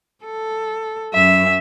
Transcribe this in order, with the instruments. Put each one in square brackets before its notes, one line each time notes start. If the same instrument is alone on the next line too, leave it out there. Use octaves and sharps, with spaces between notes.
[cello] A4
[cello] F#2 [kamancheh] E5